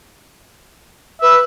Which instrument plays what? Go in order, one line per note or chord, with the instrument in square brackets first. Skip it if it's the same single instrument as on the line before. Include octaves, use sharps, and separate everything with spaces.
[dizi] B4 [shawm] E5